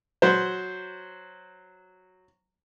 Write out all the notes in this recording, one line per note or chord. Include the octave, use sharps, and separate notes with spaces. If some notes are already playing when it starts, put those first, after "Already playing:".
F#3 C5